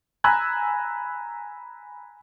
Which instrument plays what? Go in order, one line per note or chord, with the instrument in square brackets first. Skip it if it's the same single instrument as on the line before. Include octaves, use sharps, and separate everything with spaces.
[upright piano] G#5 A#5 B5 E6 F#6 G#6